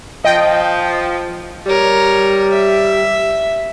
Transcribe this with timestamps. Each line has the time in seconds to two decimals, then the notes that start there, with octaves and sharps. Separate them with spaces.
0.25 F3 D#5 G5
1.66 G3 A#4 C#5
2.51 E5